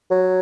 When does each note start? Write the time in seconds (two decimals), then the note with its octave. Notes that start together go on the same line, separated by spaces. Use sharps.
0.11 F#3